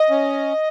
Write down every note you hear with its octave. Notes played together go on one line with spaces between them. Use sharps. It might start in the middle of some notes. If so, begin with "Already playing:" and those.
Already playing: D#5
C#4